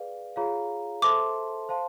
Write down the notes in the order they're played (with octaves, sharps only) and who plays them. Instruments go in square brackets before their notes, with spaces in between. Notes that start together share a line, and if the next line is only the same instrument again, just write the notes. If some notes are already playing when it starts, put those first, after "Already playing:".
Already playing: [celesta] G#4 B4 D5 F5
F4 G#4 C#5 F5 A#5
[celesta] A4 C5 E5 A5 C6 [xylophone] D6
[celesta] C5 F5 A5 C6